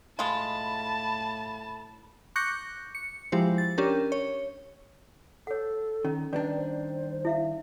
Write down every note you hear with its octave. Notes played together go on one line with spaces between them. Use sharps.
A2 G#3 F4 A5 B5
C#6 D6 F#6 G6 A#6 C#7
C#7
F3 G#3 E4 G4 C5
A6
C#4 D4 G4 A#4
C#5
A4 C#5 F#5
D#3 C#4
D#3 G3 D4 B4 D5
C5
E4 E5 F5